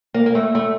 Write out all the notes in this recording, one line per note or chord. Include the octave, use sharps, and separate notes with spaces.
A#3
A#3
A3
A3